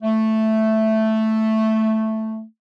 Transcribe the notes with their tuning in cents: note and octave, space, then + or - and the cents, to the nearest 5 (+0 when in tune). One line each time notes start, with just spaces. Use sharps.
A3 +0